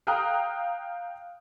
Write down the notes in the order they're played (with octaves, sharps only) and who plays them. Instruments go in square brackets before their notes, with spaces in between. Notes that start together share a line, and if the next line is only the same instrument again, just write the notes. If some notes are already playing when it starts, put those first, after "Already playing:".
[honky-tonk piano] F5 G5 A#5 D#6 F6 F#6